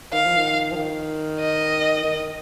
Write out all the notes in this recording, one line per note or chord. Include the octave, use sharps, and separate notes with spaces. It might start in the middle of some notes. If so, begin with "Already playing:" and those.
D#3 F5
F3
D#3
F3
D#3
D#5
D#3